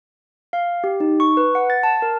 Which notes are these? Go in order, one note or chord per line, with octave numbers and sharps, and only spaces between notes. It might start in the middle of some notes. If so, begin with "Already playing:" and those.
F5
G4
D#4
C#6
B4
F#5
A6
A5
A#4